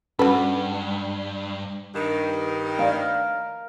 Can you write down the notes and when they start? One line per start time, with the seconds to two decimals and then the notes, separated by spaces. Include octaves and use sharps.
0.19 G2 C#4 F#4 A4 B4 A5
1.94 G2 D#3
2.79 A#4 F5